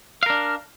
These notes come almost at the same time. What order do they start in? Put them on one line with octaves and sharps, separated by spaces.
F5 A#4 D4